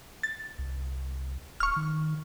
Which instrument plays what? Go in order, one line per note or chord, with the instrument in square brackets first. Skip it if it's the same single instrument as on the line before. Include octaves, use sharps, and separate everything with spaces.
[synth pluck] A6
[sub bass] C2
[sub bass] D1 [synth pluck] C#6 F6
[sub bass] D#3